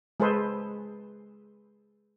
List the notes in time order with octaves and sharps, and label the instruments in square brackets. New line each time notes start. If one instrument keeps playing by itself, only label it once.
[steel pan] G#3 G#4 A4 B4 C5